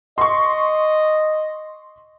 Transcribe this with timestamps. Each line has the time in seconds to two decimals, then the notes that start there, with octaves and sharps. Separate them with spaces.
0.18 D#5 C6 C#6